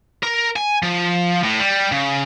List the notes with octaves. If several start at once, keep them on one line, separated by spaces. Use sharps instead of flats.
A#4
G#5
F3
A2
G3
C#3